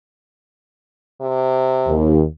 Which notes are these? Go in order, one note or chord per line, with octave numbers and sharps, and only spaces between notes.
C3
D#2